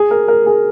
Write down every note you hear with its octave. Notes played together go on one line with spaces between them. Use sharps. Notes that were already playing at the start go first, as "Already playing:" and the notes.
Already playing: G#4
A#4
A#4
G#4